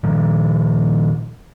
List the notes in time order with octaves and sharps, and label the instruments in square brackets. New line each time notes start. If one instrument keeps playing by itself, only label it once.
[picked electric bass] A#2 D#3 F3